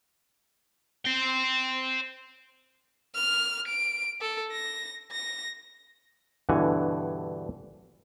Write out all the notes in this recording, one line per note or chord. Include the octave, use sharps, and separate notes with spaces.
C5 G5
F6
D7
A4
A#6
A#6
G2 B2 D3 E3 F#5 G#5